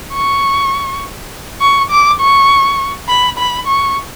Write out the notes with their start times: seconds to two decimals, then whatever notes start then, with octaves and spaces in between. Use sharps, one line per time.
0.13 C#6
1.61 C#6
1.90 D6
2.21 C#6
3.09 B5
3.38 B5
3.67 C#6